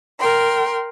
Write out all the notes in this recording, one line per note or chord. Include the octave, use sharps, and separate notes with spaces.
A#4 G5 C6